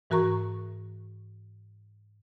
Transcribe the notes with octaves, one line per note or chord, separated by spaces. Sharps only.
G#2 E3 F#4 A#4 A#5 C#6